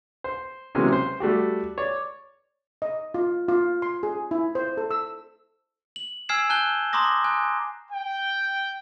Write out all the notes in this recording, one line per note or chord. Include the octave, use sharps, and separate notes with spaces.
C5
C3 E3 F#3 G#3 A#3 C#4
C5
G3 A3 F#4 G4
C#5 D5
D#5
F4
F4
C6
G#4
E4
C5
A4
E6
F#7
G#5 E6 F6 G#6 C7 E7
G#5 A5 F#6 G6 G7
A#5 C6 D6 D#6 A#6
G#5 F#6
G5